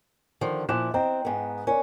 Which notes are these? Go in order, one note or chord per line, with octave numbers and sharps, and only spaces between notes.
D3 D#3 F3
A#2 F3 E4 D6 F#6 E7
C4 D#5 G5 A#5
G#2 B3
C#4 A#4 D5